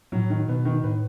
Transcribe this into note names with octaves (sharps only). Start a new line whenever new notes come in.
A2 F#3
D#3
B2 B3
D#3
A2 B4